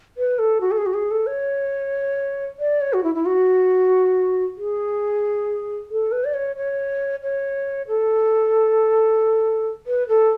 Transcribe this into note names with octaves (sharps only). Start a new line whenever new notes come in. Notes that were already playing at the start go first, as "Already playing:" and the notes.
B4
A4
F#4
A4
G#4
F#4
G#4
A4
C#5
D5
C#5
F#4
E4
E4
F#4
G#4
A4
B4
D5
C#5
C#5
C#5
A4
B4
A4